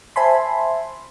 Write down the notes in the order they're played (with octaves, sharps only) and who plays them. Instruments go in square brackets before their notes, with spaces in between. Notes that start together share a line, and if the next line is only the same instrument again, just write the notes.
[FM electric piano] C5 E5 G#5 A5 B5 C6